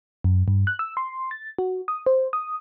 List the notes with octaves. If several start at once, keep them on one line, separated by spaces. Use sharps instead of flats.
F#2
G2
F#6
E6
C6
A6
F#4
D#6
C5
D#6